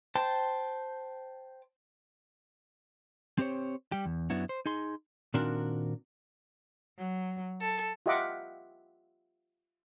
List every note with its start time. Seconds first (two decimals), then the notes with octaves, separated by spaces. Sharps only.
0.15 C5 G5 A5
3.38 C4 G4 C5 C#5
3.92 G3 G4
4.05 E2
4.30 F#2 B3 D4 E4 F#4
4.49 C5
4.66 D#4 G#4 C6
5.34 A#2 D#3 C4 D4 F#4 A#4
6.98 F#3
7.61 A4
8.06 F4 G4 D#5 E5 F#5 D6